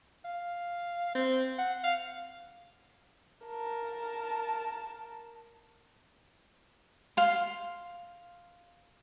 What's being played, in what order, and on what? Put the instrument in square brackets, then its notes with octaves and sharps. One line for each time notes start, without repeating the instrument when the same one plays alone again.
[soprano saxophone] F5
C4
F#5
F5
[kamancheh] A#4 A5
[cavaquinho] F5 C6